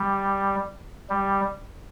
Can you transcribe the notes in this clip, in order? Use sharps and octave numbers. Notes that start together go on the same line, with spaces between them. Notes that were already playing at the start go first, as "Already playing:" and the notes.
Already playing: G3
G3